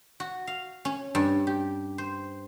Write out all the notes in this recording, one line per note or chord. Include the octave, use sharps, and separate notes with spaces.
F#4
F5
C#4
G2
G4
C5